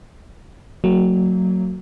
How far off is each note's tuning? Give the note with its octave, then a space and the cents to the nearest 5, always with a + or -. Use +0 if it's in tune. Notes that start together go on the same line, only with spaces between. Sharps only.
F#3 +0 A#3 -35